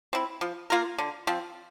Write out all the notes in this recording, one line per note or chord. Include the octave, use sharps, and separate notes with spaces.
C4 E4
F3
A#3 F4 A#4
D3
F3 C4